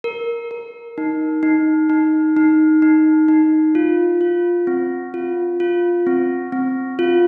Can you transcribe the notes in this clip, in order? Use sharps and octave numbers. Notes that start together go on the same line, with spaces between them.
A#4
A#4
D#4
D#4
D#4
D#4
D#4
D#4
F4
F4
C4
F4
F4
C4
C4
F4